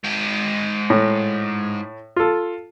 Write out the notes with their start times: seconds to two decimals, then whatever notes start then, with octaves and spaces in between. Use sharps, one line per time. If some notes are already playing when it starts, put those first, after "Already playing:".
0.04 G#2 G5
0.90 A2
2.16 F4 A4